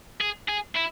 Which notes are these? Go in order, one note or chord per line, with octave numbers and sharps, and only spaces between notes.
G#4
G#4
E4